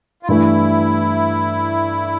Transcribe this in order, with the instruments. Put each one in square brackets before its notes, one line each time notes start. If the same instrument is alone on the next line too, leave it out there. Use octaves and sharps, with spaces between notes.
[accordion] F4
[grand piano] G2 E3 A3 [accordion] E4